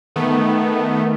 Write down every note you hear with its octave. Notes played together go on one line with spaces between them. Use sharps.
D#3 A3 B3